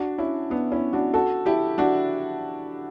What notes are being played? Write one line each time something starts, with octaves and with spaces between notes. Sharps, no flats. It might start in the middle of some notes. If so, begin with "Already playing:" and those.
Already playing: D4 F#4
C#4 E4
B3 D4
C#4 E4
D4 F#4
F#4 A4
E4 G4
D4 F#4